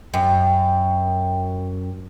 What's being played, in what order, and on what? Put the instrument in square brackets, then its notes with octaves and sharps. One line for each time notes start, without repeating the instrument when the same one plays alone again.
[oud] F#2 [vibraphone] G5